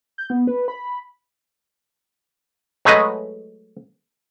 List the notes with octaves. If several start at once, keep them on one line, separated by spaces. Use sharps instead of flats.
G6
B3
B4
B5
F#3 G#3 A3 B4 D#5